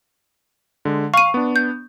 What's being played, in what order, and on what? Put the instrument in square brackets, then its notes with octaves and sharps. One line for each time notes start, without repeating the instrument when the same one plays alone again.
[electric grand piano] D3 G#3
[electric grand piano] F5 [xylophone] C#6 D#7
[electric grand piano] B3 D4
[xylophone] G6